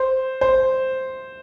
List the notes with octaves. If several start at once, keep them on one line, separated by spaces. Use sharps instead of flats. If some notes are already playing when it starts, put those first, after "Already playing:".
Already playing: C5
C5